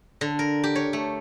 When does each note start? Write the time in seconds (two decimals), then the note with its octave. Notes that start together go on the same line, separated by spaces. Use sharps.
0.21 D3
0.39 A#4
0.64 G4
0.75 C#5
0.93 A3